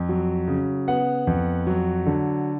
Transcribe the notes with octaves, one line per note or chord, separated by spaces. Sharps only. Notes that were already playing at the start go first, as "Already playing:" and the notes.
Already playing: F2
F#3
C#3
B3 F#5
F2
F#3
D3